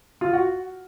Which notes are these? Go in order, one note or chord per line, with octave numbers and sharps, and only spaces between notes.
F4
F#4